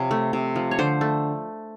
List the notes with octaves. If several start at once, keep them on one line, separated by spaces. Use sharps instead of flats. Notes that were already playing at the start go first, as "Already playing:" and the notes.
Already playing: C3 F3 C#5
A3
C3
F3
C#5
D3 C5
A3